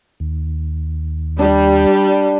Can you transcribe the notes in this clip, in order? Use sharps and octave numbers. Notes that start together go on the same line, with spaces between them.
D#2
G3 D4